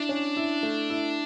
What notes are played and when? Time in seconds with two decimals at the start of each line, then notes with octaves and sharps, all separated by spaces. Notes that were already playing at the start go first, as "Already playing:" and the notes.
Already playing: D4 E4
0.09 C#4
0.37 E4
0.63 A3
0.90 E4